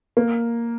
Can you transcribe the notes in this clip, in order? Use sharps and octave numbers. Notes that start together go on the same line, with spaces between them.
A#3